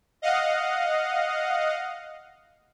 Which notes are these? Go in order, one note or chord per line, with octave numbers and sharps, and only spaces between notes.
D#5 F5 F#5